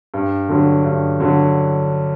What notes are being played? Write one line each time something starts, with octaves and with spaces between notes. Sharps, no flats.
G2
D3 F#3
G2
D3 F#3